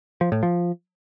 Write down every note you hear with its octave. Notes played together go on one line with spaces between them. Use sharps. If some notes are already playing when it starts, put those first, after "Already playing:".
F3
A2
F3